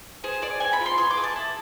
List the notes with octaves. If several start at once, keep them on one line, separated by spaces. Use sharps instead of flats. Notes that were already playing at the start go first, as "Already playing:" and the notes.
G#4 C5
G#4 D5
C4 G#5
B5
F4
C6
G#4 C6
D6
G#4
A5
E4